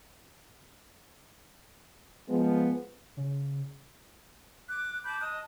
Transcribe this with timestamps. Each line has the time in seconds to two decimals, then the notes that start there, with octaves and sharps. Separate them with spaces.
2.28 F3 G#3 B3
3.17 C#3
4.68 D6 F#6
5.04 A5 B5 D6 G6
5.20 D#5 A5 D#6 F#6